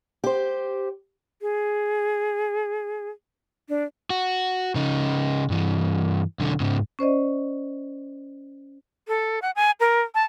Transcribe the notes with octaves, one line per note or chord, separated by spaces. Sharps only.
G4 C5
G#4
D4
F#4
C#3 D#4
G2 E3
B1 D3
G#2 C#3
C#4 C5 D5 D#5
A4
F#5
G#5
A#4
A5